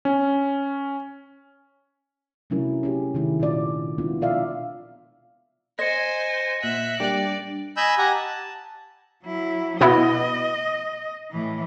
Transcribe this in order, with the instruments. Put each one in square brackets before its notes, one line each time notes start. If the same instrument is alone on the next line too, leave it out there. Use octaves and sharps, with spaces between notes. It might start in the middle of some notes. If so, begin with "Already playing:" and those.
[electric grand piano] C#4
[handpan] C3 F#3 A3 C#4 E4 A#4
C#4 G4 G#4
C3 D#3 A3 E4
A#2 D4 F4 D5
G#3 B3 C4 D4 E4 F4
B2 F4 D5 E5 F5
[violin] C5 G#5 [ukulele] D#5 [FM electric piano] C6 G#6 [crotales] A#6 C#7
[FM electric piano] A#2 F#5 [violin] E5 F#6
[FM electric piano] G3 A#3 D4 [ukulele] G4 [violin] D5
[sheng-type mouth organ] D#5 G#5 B5 E6 G6
G4 F#5 G#5 A#5
A5
[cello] F#3 E4
[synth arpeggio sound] B2 B3 E4 [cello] D#5
[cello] A2 E3